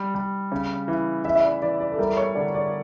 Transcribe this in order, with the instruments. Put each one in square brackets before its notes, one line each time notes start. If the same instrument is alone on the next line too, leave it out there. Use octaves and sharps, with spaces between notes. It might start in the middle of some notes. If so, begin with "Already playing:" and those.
Already playing: [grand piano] G3
G3
C#3
E3
[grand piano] E3 [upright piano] E5
[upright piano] E5
D5
[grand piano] E3 [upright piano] D5
[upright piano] D5
A4
[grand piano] G3 [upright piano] A#4
[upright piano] C#5
[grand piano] D3 [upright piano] D5
[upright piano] D5